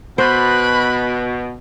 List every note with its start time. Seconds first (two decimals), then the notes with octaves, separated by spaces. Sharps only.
0.18 B2 C5 B5 F#6